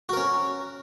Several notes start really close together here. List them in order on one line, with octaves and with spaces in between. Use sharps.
F#4 A#4 C#4